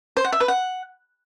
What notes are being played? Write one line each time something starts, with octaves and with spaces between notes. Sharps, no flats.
C5
F#5
E5
B4
F#5